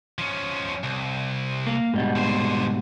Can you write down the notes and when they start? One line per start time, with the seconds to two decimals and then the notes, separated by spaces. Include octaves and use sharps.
0.19 F3 C#4
0.84 C2
1.67 A#3
1.94 G#2 B2 G3
2.16 D3 C5